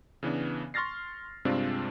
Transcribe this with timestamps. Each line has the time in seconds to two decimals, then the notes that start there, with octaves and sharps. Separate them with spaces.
0.23 C#3 E3 B3 D4
0.74 C6 C#6 F6 A6 A#6 C7
1.45 G2 C3 G#3 C4 D4 F4